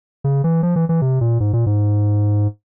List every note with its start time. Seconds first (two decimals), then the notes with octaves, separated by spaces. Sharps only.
0.24 C#3
0.44 E3
0.63 F3
0.76 E3
0.89 E3
1.02 C3
1.21 A#2
1.40 G#2
1.53 A#2
1.66 G#2